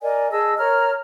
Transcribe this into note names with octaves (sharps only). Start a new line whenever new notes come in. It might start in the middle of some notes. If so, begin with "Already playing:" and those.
A#4 D5 D#5 G#5
G#4 D#5 A5 E6
A#4 C#5 A#5 F6